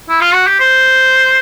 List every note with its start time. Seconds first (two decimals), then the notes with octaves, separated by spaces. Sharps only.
0.09 E4
0.21 F4
0.34 F#4
0.47 G4
0.60 C5